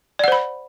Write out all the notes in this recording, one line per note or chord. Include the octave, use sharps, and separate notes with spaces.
C5 D5 F#5 B5